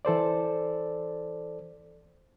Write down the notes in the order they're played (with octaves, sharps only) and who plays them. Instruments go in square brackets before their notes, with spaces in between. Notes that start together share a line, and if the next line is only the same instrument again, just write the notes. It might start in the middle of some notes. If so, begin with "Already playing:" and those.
[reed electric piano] E3 A4 C5 D5